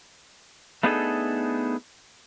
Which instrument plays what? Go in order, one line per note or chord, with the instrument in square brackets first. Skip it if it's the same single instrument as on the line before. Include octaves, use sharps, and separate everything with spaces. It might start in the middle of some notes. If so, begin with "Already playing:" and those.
[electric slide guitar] A3 B3 D4 D#4 G#4 A4